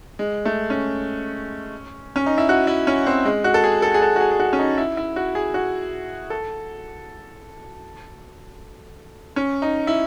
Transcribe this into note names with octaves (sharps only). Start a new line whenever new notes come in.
G#3
A3
C#4
C#4
D#4
E4
F#4
E4
C#4
C4
G#3
F#4
A4
G#4
A4
G#4
A4
F#4
G#4
G#4
F#4
C#4
D#4
E4
E4
F#4
G#4
F#4
A4
C#4
D#4
E4